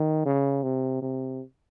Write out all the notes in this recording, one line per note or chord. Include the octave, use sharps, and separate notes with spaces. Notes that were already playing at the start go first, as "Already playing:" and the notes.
Already playing: D#3
C#3
C3
C3